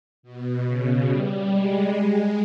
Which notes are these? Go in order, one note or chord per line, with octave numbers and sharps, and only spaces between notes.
B2
C#3
G3
G#3
G#3